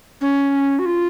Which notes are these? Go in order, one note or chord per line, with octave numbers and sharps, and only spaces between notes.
C#4
F#4
F4